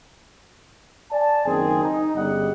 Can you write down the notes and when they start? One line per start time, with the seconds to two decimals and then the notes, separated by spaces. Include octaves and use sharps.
1.11 D5 G#5 A5
1.46 F#1 D#3 C4 G#4
1.83 D#4
2.16 G1 C#3 G3 D#5 F#5